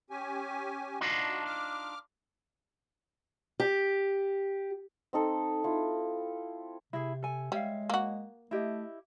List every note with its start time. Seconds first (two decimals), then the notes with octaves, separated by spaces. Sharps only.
0.10 C#4 G4 G#5
1.01 D4 D#4 F4 F#4 A5
1.46 D6 F6
3.60 G4
5.13 C4 D#4 A4
5.64 E4 F4
6.93 C3 E4 G#4
7.23 A4 G#5
7.52 G3 G#3 C#5 E5 F5
7.90 A#3 F#4
8.51 A3 E4 G4 D#5